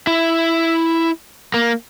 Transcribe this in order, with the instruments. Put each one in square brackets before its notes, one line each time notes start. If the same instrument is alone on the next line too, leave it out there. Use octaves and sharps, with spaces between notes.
[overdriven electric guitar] E4
A#3